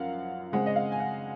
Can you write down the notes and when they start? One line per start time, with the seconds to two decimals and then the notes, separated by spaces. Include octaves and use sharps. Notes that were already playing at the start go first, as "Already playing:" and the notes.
Already playing: F#2 F3 A#4 F5 F#5
0.52 C#3 G#3 C4 F#5
0.66 D#5
0.76 F5
0.92 G#5
1.00 F#5